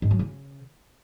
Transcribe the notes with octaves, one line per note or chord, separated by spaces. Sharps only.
G#2
F#3
C#3